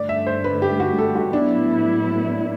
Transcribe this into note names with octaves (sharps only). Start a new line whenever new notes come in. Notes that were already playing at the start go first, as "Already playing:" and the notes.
Already playing: G2 D3 A3 D5
E5
C5
B4
G4
F#4
A4
F#4
A2 F#3 B3 D4 E4